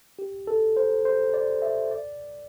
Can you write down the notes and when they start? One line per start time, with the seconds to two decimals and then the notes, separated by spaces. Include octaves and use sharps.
0.19 G4
0.47 A4
0.77 C5
1.05 C5
1.34 D5
1.62 E5
1.91 D5